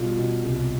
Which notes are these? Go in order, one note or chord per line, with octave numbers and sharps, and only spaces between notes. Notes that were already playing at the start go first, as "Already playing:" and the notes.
Already playing: B2 G3 F4
B2
C2